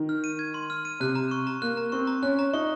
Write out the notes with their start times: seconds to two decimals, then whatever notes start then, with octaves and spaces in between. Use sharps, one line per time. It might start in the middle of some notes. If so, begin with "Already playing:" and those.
Already playing: D#3
0.09 F6
0.24 D#7
0.39 G#6
0.54 C6
0.70 F6
0.85 D#7
1.00 C3 F#6
1.15 A#5
1.31 C#6
1.47 A#5
1.62 A#3 F#6
1.77 A#5
1.92 C4 C#6
2.07 A#5
2.23 C#4 F#6
2.39 A#5
2.53 D#4 C#6